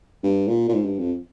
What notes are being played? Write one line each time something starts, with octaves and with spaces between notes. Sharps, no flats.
G2
A#2
A#2
G#2
G2
F2